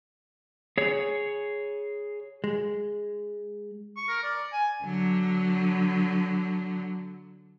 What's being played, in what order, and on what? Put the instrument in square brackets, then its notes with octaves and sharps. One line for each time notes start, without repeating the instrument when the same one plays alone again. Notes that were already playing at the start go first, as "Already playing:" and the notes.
[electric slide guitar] G#4 C#5
[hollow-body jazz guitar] G#3
[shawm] C#6
A#4
D5
G#5
[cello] D3 F#3